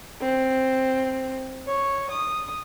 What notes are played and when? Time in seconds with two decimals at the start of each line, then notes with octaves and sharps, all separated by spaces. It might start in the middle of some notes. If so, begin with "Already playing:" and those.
0.20 C4
1.67 C#5
2.11 D#6